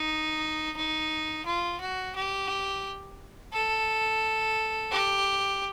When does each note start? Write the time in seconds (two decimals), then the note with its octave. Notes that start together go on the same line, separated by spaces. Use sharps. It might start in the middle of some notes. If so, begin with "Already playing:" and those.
Already playing: D#4
0.77 D#4
1.46 F4
1.81 F#4
2.16 G4
3.53 A4
4.91 G4